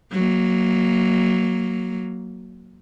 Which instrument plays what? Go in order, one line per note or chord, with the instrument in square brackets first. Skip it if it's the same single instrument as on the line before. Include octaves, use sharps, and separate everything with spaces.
[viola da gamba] F#3 A#3